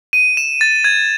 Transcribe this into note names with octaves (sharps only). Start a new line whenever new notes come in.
D#7
E7
A6
G#6